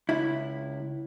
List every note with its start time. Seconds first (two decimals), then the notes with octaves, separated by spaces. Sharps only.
0.09 C#2 E4